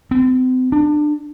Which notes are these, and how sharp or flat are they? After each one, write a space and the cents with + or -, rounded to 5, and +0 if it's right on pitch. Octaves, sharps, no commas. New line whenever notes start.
C4 -40
D4 +25